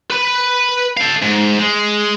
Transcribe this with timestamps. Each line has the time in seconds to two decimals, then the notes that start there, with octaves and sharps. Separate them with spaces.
0.10 B4 B5
0.97 A4 F5
1.22 G#2
1.59 G#3